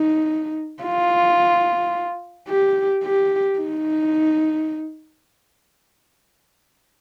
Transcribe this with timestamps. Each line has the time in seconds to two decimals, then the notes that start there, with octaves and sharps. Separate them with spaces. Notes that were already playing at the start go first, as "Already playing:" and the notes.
Already playing: D#4
0.83 F4
2.49 G4
3.04 G4
3.59 D#4